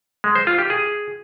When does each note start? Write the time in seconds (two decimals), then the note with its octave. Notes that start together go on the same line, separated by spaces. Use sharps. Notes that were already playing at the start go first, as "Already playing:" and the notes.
0.24 G#3
0.35 C5
0.47 F4
0.59 G4
0.70 G#4